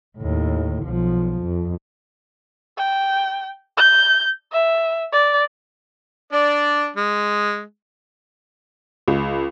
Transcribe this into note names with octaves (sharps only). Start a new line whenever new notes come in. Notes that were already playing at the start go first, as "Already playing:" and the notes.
D#2 A2
B1 F3
F2
G5
G6
E5
D5
D4 D5
G#3
C#2